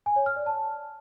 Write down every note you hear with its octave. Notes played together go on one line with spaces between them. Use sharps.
G#5
C#5
F6
D5
A5